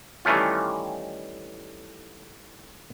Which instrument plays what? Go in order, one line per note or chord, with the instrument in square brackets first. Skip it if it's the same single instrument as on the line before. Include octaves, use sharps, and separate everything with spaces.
[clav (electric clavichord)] D#3 E3 G3 A3 C#4 F4